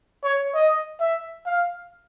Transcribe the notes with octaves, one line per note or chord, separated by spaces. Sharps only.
C#5
D#5
E5
F5